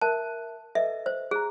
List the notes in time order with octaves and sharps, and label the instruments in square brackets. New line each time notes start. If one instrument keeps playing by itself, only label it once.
[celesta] A#4 E5 F#6 [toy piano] A5
[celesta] A4 B4 D#5 [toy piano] E5
[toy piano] C5
[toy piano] G#4 [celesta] A#5 F#6